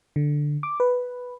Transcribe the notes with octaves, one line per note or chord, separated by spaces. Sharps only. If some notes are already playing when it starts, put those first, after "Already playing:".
D3
D6
B4